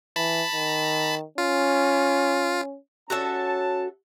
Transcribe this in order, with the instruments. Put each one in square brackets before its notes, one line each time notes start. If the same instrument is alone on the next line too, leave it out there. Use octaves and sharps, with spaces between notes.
[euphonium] E3 [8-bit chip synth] A5 B5
[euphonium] D#3
[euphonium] C#4 [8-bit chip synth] F4
[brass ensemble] C#4 A5 [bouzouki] F#4 A4 E5